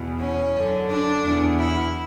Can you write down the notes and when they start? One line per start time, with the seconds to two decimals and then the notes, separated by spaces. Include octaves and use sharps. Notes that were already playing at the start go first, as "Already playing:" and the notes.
Already playing: E2 B2
0.20 C#4
0.55 F#2 D3
0.90 D4
1.25 E2 B2
1.60 E4